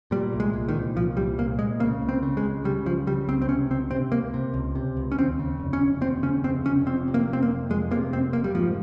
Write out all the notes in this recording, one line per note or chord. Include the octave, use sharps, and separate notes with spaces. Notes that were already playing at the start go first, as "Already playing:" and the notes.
A#2 G3
C2
G#3
A#2
D#3
C2
A#2 F3
C2 G3
A#2 A#3
C2 G#3
C#3 A#3
C#2
C4
C#3
G#3
C#2
C#3 G3
C#2 F3
C#3 G3
C#2 C4
C4
C3 C#4
C#2 C4
C3 C4
C#2 A#3
C3
C#2
C3
C#2
C#4
D#2 C4
C#3
F1
C#4
F1
D#2 C4
C#3 C#4
F1 C4
F1 C#4
F2 C4
C3
A#3
F1
C4
A#3
F1
F2 G#3
C3 A#3
F1 C4
F1 A#3
G3
G#2 F3